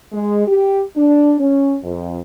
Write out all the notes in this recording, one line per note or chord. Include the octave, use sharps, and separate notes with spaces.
G#3
G4
D4
C#4
F2